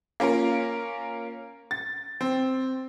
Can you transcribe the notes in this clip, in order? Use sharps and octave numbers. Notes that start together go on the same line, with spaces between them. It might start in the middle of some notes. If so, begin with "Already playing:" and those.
A#3 C#4 F4 A#4
A6
C4